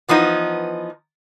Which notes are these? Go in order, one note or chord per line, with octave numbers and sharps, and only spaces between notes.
E3 F3 B3 D#4